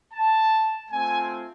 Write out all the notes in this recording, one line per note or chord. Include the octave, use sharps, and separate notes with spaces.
A5
A3 C4 F4 G#5